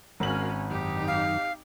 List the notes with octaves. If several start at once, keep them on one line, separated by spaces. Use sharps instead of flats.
G#1 C#4 F#4 A#4 F5 F#7
F#2 D#3 D#4 G4
F5